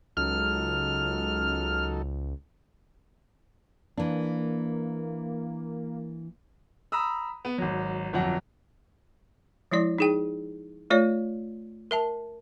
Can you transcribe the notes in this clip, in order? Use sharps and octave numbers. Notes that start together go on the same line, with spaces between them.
C#2 F#3 D#4 A4 F6
E3 A#3 D4
A#5 B5 D#6 E6
B3
G#1 F#3
G1 F2 F#3 F#5
F3 G#3 E4 D5
D#4 G#4 G5
A3 F4 C#5 D5
A#4 E5 A5